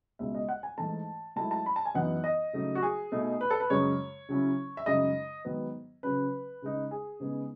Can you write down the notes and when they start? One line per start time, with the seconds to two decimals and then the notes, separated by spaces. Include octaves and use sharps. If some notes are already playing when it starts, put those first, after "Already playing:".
0.19 C#2 B2 G#3 E5
0.35 D#5
0.49 F#5
0.63 G#5
0.78 G#2 E3 A3 A5
1.36 G#2 F#3 A3 E4 A5
1.51 A5
1.66 B5
1.76 A5
1.86 G#5
1.95 F#2 E3 B3 D#4 F#5
2.24 D#5
2.53 C#3 F#3 A3 D#4
2.75 F#4
2.83 G#4
3.12 B2 A3 D#4
3.41 B4
3.50 A4
3.60 B4
3.70 F#2 C#3 G#3 C#5
4.29 C#3 F#3 C#4 E4
4.77 E5
4.86 F#2 C#3 G#3 D#4 D#5
5.45 G#2 D#3 F#3 B3
6.03 C#3 F#3 C#4 B4
6.62 C#3 G#3 D#4
6.91 G#4
7.20 C#3 G#3 B3 D#4